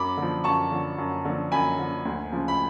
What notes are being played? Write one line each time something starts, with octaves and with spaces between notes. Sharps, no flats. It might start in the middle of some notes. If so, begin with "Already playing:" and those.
Already playing: F#2 B5 D6
D3
F3
F#2 A5 C#6
D3 F3
F#2
D3 F3
F#2 G#5 B5
D3 F3
D2
C#3 F3
B5